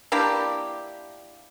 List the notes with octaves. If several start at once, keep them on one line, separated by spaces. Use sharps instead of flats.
A#3 D4 E4 G4